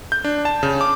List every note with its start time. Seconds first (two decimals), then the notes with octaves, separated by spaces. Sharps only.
0.12 G6
0.24 D4
0.45 A5
0.63 C#3
0.81 D6